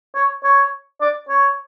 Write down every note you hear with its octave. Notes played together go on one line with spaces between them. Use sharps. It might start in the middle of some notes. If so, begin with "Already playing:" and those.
C#5
C#5
D5
C#5